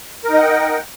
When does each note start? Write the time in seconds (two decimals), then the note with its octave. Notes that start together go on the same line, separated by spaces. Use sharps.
0.24 A#4
0.29 D#4
0.34 D#5
0.38 F#5
0.43 G5